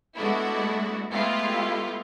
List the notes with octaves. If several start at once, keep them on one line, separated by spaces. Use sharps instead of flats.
G#3 A3 B3 D4 E4 F#4
G#3 A3 B3 E4 F4 G4